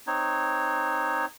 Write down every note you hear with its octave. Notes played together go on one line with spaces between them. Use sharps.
C4 D#4 C#5